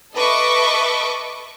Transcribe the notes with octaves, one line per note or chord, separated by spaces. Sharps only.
A4 B4 D#5 E5 C#6 D6